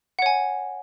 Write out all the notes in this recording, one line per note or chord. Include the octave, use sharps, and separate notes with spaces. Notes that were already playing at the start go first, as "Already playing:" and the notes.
C#5 F#5 G#5